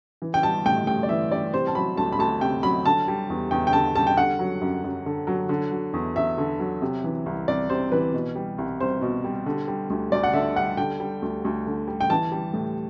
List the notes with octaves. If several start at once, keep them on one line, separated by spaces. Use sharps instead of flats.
E3
G5
G3 A5
A2 G5
A2 G5
D5
E3 E5
G3 D5
C3 C5
A5
F#3 B5
D2 A5
B5
D2 A5
C3 G5
F#3 B5
D3 A5
G3
E2
E2 G5
G5
D3 A5
G3 A5
G5
D3 F#5
F#3
F#2
F#2
D3
F#3
D3
F#3
E2
E2 E5
D3
F#3
C3
E3
C2
C2 D5
C3 C5
E3 B4
B2
G3
C2
C2 C5
B2
G3
D3
G3
D2
D2 D5
F#5
D3 E5
G3 F#5
D3 G5
G3
D2
D2
D3
G3
G5
E3 A5
G3
A2